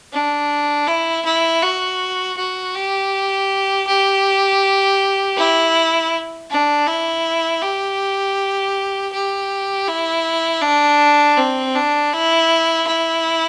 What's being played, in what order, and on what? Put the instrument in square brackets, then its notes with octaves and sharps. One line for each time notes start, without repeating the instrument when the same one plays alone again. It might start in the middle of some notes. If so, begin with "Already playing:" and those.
[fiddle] D4
E4
E4
F#4
F#4
G4
G4
E4
D4
E4
G4
G4
E4
D4
C4
D4
E4
E4